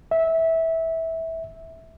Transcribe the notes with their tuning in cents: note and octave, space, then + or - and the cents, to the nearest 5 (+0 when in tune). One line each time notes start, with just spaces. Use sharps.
E5 -15